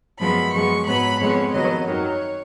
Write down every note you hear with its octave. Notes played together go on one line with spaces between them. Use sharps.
F#2 F3 G#3 B3 B5
F#2 F3 G#3 B3 C#6
G#2 F#3 B3 B5
F2 F3 G#3 B3 C#5
F2 D#3 F#3 B3 D#5
F#2 D#3 F#3 C#5